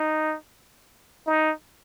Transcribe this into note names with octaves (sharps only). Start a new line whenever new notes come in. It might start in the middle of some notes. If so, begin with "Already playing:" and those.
Already playing: D#4
D#4